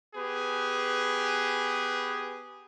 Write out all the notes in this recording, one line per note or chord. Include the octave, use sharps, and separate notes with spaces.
B3 G4 G#4 B4